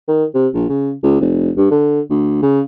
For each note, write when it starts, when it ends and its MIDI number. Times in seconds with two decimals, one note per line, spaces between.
0.08 0.25 51
0.34 0.48 48
0.54 0.65 34
0.69 0.92 49
1.03 1.16 37
1.21 1.50 29
1.57 1.68 43
1.71 2.01 50
2.10 2.41 38
2.42 2.61 49